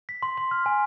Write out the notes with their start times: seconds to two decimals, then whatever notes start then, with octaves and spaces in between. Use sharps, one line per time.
0.09 B6
0.23 C6
0.38 C6
0.51 F6
0.66 G#5